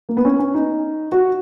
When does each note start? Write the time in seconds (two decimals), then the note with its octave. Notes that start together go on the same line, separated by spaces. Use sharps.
0.09 A#3
0.17 B3
0.25 C#4
0.39 C#4
0.54 D#4
1.12 F#4